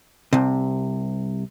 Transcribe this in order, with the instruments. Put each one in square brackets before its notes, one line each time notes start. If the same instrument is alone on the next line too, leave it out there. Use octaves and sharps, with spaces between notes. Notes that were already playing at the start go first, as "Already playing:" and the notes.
[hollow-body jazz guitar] C2 C3